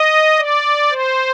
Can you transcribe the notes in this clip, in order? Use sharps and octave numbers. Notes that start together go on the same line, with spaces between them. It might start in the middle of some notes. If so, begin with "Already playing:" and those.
Already playing: D#5
D5
C5